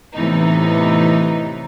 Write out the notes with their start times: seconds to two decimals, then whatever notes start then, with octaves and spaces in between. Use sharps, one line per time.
0.14 A2 C3 E3 B3 D#4